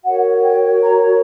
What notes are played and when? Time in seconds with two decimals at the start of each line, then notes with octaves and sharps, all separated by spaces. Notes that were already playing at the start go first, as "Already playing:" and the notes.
0.03 F#4 A#4 C#5 F#5
0.42 G5
0.82 A#5